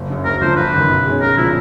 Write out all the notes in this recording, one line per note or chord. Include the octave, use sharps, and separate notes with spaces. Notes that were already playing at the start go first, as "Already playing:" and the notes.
Already playing: F#1
F#2 C#3
D2 A#4
D3 F3 A3 C5
G1 B4
F#2 D#3
B2
G#3 C#4
B1 A#4
A#2 F3 E4